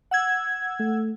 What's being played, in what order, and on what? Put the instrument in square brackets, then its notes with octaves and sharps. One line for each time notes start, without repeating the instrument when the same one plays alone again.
[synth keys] F#5 E6 G#6
[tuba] A3